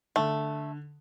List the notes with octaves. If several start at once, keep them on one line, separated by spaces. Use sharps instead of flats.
D3 A3